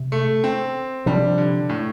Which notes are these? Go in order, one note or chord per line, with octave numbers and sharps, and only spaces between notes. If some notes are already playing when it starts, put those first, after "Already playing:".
Already playing: C3
A3
C4
C3 F3 G3 D4
D3
A2